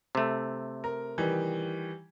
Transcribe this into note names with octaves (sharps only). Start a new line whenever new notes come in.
C3 A3
A#4
D#3 E3 G3